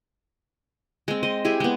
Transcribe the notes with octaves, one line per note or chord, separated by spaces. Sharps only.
G#3 C4
C5 D#5
E4 G4 G#4
G#3 B3